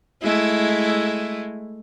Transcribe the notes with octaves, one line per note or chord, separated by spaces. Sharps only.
G#3 A3 E4